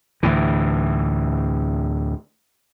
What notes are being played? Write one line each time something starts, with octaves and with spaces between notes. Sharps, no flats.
D2 A2 E3